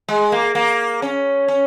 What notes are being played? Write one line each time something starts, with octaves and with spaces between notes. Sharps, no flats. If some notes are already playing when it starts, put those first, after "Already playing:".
G#3
A#3
A#3
C#4
C#4